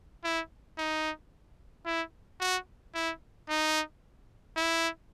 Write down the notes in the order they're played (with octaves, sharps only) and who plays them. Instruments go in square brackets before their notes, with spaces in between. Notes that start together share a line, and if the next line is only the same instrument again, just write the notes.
[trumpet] E4
D#4
E4
F#4
E4
D#4
E4